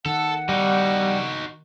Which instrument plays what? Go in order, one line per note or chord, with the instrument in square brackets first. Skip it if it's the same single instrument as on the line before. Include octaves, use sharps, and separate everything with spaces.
[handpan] D#3 [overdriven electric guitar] A4 [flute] F#5
[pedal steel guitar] G3 [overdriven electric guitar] D#4 F#4